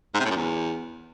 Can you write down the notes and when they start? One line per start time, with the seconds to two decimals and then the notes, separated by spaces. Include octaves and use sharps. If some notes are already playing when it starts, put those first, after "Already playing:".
0.14 G#2
0.20 C3
0.25 A2
0.30 F#2
0.36 E2